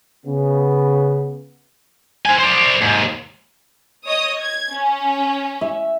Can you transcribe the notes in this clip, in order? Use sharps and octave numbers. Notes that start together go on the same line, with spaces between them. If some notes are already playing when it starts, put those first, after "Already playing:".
C#3 B3
C5 G#5
C5 D5
D#2 G#2
C#5 D#5 D#6
G#6
C#4
E5